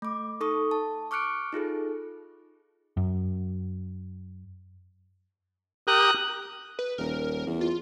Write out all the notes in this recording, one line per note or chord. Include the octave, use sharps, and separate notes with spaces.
A3 D6
D#4 A4 C#6 D#6
A5
C#6 D6 F6 F#6 C#7 D7
D#4 F4 G#4 A4
F#2
G4 A#4 D#6 F#6
B4
D#1 A#4
E2
F4